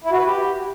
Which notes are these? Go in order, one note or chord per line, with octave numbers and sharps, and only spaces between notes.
E4
F#4
B4
G4